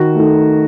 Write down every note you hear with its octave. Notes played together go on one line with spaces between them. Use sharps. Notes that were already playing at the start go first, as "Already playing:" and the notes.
Already playing: D#3 F#4
A3 D#4